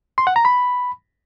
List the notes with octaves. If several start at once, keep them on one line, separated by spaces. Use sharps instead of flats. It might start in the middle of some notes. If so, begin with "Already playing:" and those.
C6
F#5
A#5
B5